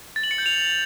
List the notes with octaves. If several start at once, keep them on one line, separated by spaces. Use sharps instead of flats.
A6
F#7
C#7
G6
F7